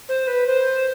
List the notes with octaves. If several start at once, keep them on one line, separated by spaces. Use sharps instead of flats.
C5
B4
C5